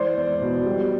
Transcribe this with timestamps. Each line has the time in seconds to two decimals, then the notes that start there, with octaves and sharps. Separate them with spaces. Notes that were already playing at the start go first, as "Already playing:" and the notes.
Already playing: E3 G#3 C5 D5
0.16 E2
0.41 B2
0.66 G3